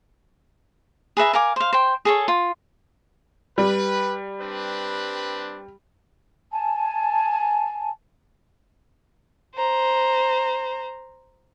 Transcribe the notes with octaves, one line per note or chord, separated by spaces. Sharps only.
G#4 B4 E5 A#5
A#4 F5 G#5 D6
C5 F5
C5 G5
G#4 A4 C#5
F4
G3 B4
C4 D4 B4
G#5 A5
C5 A#5